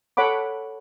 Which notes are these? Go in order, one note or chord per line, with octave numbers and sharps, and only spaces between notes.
A4 C#5 F#5 B5 D6